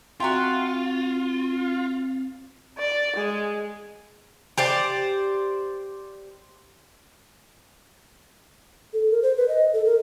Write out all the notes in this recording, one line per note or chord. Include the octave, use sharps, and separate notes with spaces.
C4 F4 F#4 E5 G5 A#5 C6
D5
G#3
G4 C5 D5
A4
A#4
C5
B4
D#5
A4
A#4